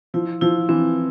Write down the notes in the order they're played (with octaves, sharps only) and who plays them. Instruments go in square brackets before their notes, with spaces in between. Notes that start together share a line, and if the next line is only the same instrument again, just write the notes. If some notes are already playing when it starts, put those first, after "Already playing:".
[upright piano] F3 [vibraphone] E4
[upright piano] F3 [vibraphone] E4
[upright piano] E3 [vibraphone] C4